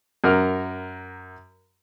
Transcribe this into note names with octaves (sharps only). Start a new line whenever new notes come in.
F#2 A#4 F6